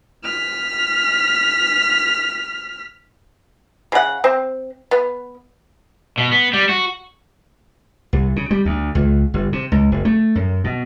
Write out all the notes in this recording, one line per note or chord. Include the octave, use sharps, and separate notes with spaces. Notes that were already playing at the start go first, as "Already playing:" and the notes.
F6 B6
C#3 F#5
C4
B3
B2
B3
G3
F#4
C2
C#3
G3
D2
C#2
G1
C3
C#2
F#1
A3
F#2
B2